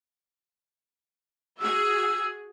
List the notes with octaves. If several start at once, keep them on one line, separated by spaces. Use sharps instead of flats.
F#4 G#4 E6